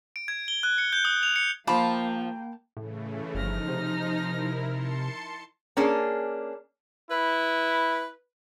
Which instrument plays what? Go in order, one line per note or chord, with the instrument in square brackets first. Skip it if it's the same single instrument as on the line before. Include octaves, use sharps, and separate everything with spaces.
[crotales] D7
G#6
G7
F#6
C#7
G6
D#6
F7
C#7
[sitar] F3 F4 [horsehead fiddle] A#3 G5 [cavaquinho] A5 B5 D6
[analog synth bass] A2 [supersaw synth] C#3 E3 A3
[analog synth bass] G1 [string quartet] F3 F6 A#6 [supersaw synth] D#4
[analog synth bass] C3
[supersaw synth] E4 A#4
A5 C6 C#7
[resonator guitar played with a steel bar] A#3 C#4 D4 G#4
[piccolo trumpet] E4 [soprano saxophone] B4